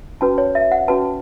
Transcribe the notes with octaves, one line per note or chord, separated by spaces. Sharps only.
C#4 F#4 B4 A5
C#5
E5
F#5
C#4 F#4 B4 A5